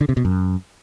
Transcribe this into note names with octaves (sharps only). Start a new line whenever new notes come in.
D3
C3
B2
F#2